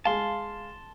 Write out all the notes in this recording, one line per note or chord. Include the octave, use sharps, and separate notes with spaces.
G#3 F5 A5 C6